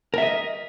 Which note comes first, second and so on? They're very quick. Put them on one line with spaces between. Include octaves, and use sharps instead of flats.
A#4 E5 D#5